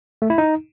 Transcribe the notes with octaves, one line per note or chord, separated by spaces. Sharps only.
A3
E4
D#4